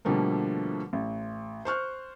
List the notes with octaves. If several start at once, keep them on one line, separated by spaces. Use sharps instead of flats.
B2 D3 F3 G3 A3 A#3
A1
C5 C#6 F6 F#6